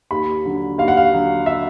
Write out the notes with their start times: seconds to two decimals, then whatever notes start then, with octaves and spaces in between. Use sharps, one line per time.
0.11 D#2 B5
0.45 D3 F#3
0.78 D#2 F5
0.88 F#5
0.97 F5
1.12 D3 F#3
1.46 E5